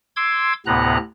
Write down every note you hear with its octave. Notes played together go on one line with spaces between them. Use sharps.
C6 D6 E6 G#6
D2 A2 C3 B3 A#5 F#6